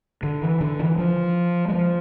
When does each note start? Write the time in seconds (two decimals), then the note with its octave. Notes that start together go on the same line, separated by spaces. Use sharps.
0.23 D3
0.42 E3
0.61 D3
0.79 E3
0.98 F3
1.68 G#3
1.75 F3